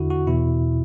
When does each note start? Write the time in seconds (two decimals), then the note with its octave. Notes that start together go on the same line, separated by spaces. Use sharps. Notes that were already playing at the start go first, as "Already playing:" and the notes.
Already playing: E2 D3 E4 F#4
0.10 F#4
0.27 E2 B2 E4